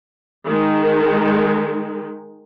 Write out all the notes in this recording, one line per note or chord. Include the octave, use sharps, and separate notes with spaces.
D#3 G#3